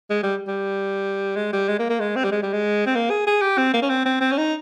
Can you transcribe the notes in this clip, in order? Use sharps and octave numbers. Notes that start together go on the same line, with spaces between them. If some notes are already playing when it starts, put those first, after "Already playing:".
G#3
G3
G3
G#3
G3
G#3
A#3
A#3
G#3
C4
G3
G#3
G3
G#3
C4
A#3
G#4
G#4
G4
C4
A#3
C#4
C4
C4
C4
C#4
D#4